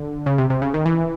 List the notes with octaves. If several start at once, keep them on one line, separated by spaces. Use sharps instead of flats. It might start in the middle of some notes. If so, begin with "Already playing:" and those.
Already playing: D3
C#3
C3
C3
C#3
D#3
E3